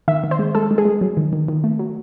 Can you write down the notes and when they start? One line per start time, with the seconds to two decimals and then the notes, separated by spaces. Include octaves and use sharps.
0.08 D#3 E5
0.24 D#3
0.31 C5
0.39 G#3
0.55 G#3 A4
0.71 G#3
0.78 G#4
0.85 G#3
1.01 F#3
1.17 D#3
1.33 D#3
1.48 D#3
1.64 A3
1.79 F#3